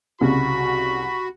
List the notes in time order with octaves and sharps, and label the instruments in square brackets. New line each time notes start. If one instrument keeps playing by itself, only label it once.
[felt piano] C2 [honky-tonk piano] C#3 [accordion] F#4 [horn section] B5